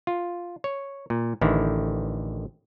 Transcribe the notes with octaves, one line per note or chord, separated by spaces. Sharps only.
F4
C#5
A#2
A1 D3 D#3 E4